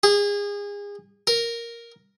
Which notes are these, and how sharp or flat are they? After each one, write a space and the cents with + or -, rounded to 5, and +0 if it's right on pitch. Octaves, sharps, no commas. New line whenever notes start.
G#4 -30
A#4 +0